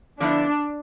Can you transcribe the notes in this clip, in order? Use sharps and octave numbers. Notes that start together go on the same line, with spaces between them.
D3 F3 B3 D4 E4